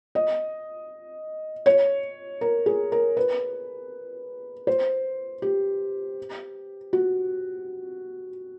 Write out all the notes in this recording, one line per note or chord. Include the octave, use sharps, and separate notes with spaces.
D#5
C#5
A#4
G#4
A#4
B4
C5
G4
F#4